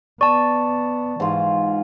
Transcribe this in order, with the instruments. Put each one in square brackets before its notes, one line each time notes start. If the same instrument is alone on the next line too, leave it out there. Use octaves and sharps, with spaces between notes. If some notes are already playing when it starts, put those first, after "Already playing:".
[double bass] B3 [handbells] D5 A5 [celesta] C#6
[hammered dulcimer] G#2 F4 [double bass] E3